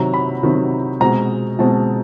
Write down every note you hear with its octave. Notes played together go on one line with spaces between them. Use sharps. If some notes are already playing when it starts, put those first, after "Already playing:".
Already playing: C3 D#3 F#3 A#5
B5
C3 D#3 F#3
B2 G#3 C4 A#5
B2 G#3 C4 A5